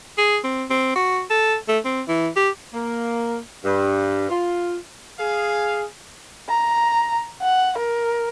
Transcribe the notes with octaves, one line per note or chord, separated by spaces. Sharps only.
G#4
C4
C4
F#4
A4
A3
C4
E3
G4
A#3
G2
F4
G#4 F5
A#5
F#5
A#4